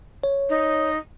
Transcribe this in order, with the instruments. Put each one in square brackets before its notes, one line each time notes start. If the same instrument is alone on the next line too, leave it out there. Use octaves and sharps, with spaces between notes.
[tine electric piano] C#5
[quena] D#4